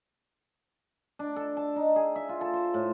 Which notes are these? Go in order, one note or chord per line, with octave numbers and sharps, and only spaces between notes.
D4
A4
A5
D#4
G#4
E5
F4
A4
C5
A2